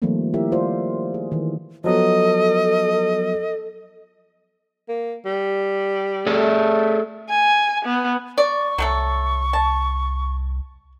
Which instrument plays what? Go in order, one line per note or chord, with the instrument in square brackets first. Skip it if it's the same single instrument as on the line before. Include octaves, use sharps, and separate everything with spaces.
[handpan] D#3 F3 G3 A3 A#3 C4
E4 G4 A#4 C#5 E5
F4 C5 D5
G#4
D#3 E3
[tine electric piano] F3 F#3 B3 [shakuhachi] A4 [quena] D#5
[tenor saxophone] A#3
G3
[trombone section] A3 [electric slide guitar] G#4 A4 D5
[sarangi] G#5
B3
[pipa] D5 [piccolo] C#6
[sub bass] C2 [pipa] F#3 A3 A4
[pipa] A5